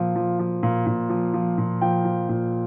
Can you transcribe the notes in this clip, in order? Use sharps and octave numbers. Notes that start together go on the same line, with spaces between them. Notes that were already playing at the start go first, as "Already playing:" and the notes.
Already playing: A#2 F3
F3
F3
A#2
A#2
F3
F3
A#2
F3 G5
F3
A#2